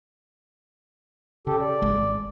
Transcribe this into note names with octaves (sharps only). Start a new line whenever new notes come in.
C#3 G4 A4
D5
G#1 G#3